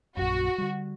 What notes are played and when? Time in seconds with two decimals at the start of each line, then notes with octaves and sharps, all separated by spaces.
0.17 A#1 F#2 F#4
0.58 D3 G3